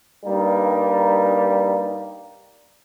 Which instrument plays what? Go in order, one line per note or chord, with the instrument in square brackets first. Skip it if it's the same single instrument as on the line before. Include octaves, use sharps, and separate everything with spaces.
[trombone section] G2 G3 A#3 D#4